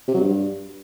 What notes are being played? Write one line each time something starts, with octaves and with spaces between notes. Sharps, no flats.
C3
F#3
G2